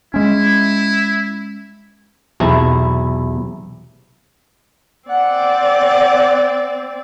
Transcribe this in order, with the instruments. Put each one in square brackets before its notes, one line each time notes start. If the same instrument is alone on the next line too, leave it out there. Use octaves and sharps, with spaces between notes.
[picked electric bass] G#3 C#4 [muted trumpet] E4
[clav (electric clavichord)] B1 E2 C3 E4
[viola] C4 D5 [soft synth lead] F#5